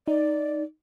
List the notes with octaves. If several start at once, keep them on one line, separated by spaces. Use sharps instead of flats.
D#4 D5